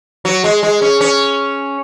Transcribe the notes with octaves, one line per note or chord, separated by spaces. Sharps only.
F#3
G#3
G#3
C#4
C#4